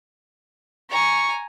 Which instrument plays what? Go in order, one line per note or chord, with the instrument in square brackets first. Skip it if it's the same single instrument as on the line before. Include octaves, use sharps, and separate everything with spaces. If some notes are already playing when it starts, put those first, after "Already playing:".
[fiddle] G#5 A#5 [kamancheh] C#6